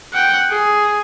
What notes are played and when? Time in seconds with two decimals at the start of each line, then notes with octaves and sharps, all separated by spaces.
0.13 F#5 G5
0.50 G#4